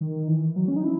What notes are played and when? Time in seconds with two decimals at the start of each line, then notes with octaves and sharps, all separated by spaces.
0.01 D#3
0.28 E3
0.56 F#3
0.68 C#4
0.76 D#4
0.84 E4